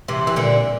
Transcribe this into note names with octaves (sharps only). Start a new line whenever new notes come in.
C3 E3
E3
A#2 D3